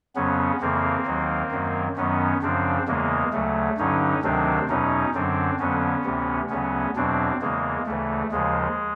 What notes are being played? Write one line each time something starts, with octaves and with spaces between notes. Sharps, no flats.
F2 C#3 F#3 B3 C#4
F2 C#3 E3 A#3 C4
D#2 D#3 F#3
F#2 D#3 F#3
F#2 D#3 F#3 B3 C#4
F#2 C#3 F3 C4 D4
E2 C#3 E3 G#3 A#3
D2 C#3 F#3 A3
G2 D3 F#3 C#4 D#4
D2 C3 D#3 F#3 C4 D4
E2 B2 F#3 C#4 D#4
F#2 D3 F#3 C4 D4
F2 D3 F#3 B3 C#4
D2 C3 E3
D2 C#3 F#3 B3 C#4
E2 B2 F#3 C4 D4
E2 C#3 E3 G#3 A#3
D2 C#3 E3 A3
D#2 C#3 F3 G#3